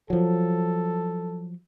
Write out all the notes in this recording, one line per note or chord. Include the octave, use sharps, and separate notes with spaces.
F3 F#3 A4